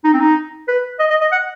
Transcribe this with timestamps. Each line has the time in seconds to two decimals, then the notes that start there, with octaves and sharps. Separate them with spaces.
0.04 D#4
0.13 C4
0.20 D#4
0.68 B4
0.99 D#5
1.10 D#5
1.21 D#5
1.32 F#5